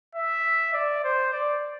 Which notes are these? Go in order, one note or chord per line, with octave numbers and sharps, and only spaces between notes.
E5
D5
C5
D5